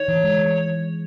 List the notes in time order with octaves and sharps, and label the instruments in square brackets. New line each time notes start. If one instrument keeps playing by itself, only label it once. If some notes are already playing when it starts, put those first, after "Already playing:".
Already playing: [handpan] D#4 [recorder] C#5
[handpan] E3
G#3
E3